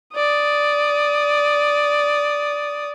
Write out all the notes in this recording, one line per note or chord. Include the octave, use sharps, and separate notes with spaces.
D5 D#6